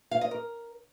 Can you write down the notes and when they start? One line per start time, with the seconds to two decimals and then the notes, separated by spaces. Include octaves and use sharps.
0.11 F5
0.21 D#5
0.31 A#4